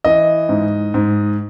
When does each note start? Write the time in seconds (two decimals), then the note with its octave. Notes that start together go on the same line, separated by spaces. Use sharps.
0.04 E3 D#5
0.49 G#2
0.94 G#2